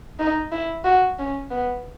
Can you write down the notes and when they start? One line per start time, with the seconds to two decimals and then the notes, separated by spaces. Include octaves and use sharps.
0.19 D#4
0.52 E4
0.84 F#4
1.19 C#4
1.51 B3